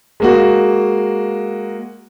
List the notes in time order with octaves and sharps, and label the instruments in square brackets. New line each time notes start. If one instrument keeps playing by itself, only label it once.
[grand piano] G#3 A#3 F#4